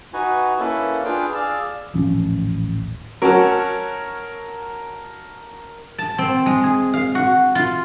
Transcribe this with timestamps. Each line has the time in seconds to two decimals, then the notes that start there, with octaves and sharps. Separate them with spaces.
0.13 D#4 F#4 B4 G#5
0.59 A#3 C#4 E4 A4 B4
1.05 D4 F4 G#4 B4 F5 G5
1.34 G#4 D5 F5 E6
1.93 D#1 A1 F3 C#4
3.22 F#3 C#4 F#4 A#4 A5
5.98 A5
6.18 C4
6.46 G#3
6.64 G#4
6.94 F5
7.15 F#4
7.55 F4